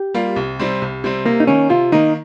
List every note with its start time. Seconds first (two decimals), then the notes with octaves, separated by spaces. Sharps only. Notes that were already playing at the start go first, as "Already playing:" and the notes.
Already playing: G4
0.14 G3 A#3 F4
0.36 C2
0.59 C3 G3 C4
0.82 C2
1.04 C3 G3 C4
1.25 C3 A#3
1.40 D#4
1.47 D#3 A#3 C#4
1.69 C3 F4
1.92 D#3 A#3 D#4